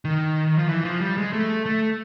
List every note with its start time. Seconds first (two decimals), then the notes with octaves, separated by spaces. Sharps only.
0.05 D#3
0.58 F3
0.69 E3
0.85 F3
1.01 G3
1.18 G#3
1.33 A3
1.66 A3